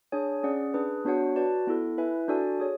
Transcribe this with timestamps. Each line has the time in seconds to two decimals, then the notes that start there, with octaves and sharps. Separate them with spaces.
0.12 D4 G#4 C#5 G#5
0.43 C#4 G#4 D5 F#5
0.74 D4 G#4 B4
1.05 B3 D4 F#4 C#5 F#5
1.36 F#4 B4 D5 A5
1.67 B3 E4 A4
1.98 E4 B4 E5 G#5
2.28 D4 F#4 A4 D5 G#5
2.60 G#4 C#5